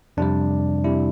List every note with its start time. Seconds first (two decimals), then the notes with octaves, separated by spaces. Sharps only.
0.17 F2 C3 G3 D4
0.84 C3 G3 E4